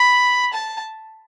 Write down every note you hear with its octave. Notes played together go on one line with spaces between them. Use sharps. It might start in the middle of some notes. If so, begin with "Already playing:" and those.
Already playing: B5
A5